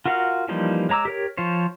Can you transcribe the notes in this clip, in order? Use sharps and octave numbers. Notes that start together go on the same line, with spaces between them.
F4 F#4 A#4 F5 F#5
E3 F3 G3 A#3 D#4
G#3 C#5 A#5 D6 E6
G4 A#4 C#5
F3 F4 C5 C#5